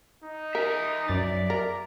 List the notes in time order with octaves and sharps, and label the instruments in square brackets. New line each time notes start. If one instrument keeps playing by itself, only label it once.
[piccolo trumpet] D#4
[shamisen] A#4 [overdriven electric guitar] E5 G#5
[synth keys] F#2 A6 [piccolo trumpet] D5
[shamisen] A#4 [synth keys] A#5